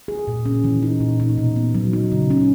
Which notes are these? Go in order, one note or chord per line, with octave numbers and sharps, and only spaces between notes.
G#4
A#2
C#4
E3
D#4
A#2
D#4
B2
B3
F#3
D#4
C#3
C#4